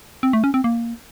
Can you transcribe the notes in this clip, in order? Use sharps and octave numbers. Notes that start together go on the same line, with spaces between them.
C4
A3
C#4
C4
A#3